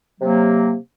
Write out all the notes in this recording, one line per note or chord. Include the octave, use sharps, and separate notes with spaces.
C3 F#3 A#3